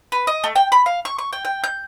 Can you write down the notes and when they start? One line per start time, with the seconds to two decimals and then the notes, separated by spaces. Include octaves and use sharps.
0.12 B4
0.27 D#5
0.44 A3
0.56 G5
0.72 B5
0.86 F5
1.05 C#6
1.18 C#6
1.33 G5
1.45 G5
1.64 G6